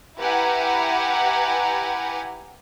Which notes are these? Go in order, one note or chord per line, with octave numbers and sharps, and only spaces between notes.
E4 G4 B4 F#5 G#5 A#5